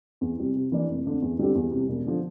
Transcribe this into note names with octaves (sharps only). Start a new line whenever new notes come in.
E2
C3 G3 C4
C3
E3 A#3 D4
F1
F2 D3
E2
D3 G3 C4 G4
E2
C3 G3
E1
D3 F3